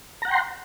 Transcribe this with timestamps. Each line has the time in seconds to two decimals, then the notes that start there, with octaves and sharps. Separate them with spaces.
0.22 A#5
0.25 F#5
0.28 G5
0.31 C6